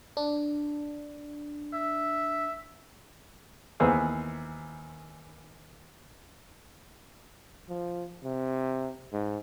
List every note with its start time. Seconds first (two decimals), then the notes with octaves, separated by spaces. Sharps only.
0.17 D4
1.73 E5
3.80 D#2 E3 B3 G#4 C5 E6
7.69 F3
8.24 C3
9.12 G#2